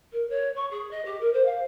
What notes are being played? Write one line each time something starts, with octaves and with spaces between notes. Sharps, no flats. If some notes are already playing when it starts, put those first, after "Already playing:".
A#4
C#5
C#6
G#4
D#5
G4
A#4
C5
F5